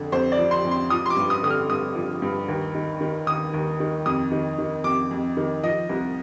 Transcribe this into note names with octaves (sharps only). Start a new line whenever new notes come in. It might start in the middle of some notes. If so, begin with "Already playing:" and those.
Already playing: F2 D3
F2 C5
D5
F3
C6
F2
C6
F3 D#6
C6
D6
G2
D#6
D3 D#6
F6
G2 D#6
F3
G2
D#2
D#3
D#3
D#2 D#6
D#2
D#3
F2 D#6
D#3
D#3
F2 D6
F2
D#3
F3 D#5
C2